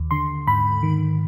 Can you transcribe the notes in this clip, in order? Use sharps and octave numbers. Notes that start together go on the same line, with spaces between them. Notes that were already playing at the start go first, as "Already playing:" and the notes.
Already playing: D#2
D3 C6
G#2 B5
D#3